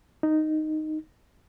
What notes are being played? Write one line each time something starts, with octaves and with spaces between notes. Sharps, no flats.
D#4